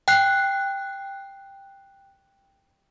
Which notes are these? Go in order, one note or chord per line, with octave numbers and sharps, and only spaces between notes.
G5 F#6 C7